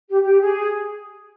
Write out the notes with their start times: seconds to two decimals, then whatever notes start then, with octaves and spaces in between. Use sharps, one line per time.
0.09 G4
0.23 G4
0.40 G#4